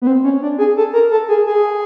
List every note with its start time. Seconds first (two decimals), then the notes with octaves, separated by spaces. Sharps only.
0.02 B3
0.07 C4
0.24 C#4
0.42 D4
0.58 G#4
0.77 A4
0.93 A#4
1.11 A4
1.29 G#4
1.46 G#4